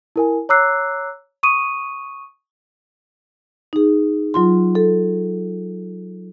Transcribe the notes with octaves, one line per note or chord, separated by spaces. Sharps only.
E4 A#4 G#5
C#5 A#5 D6 E6 F#6 C7
C#6 D#6 D#7
D#4 G#4
F#3 F4 C6
A4